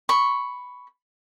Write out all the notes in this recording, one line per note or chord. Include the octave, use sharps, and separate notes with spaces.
B5 C#6